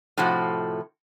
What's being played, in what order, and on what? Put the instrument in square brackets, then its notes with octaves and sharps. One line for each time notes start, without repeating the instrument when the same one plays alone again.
[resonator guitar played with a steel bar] A2 C3 F3 F#4 A4